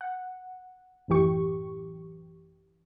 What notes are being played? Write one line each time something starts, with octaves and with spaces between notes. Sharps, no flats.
F#5
A1 F#2 E3 G4 C#6